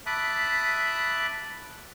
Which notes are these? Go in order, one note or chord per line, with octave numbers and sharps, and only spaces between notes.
E5 A5 B5 D6 D#6 F#6